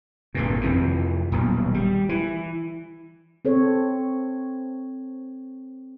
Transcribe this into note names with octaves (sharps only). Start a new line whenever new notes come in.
G#1 G2 A#2
F2 C3 E3
D#1 B1
G3
E3
C4 A4 C#5